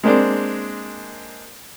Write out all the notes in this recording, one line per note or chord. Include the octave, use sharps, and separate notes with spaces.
G#3 A#3 C4 D4